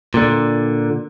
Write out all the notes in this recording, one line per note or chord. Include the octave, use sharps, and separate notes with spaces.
A#2 D3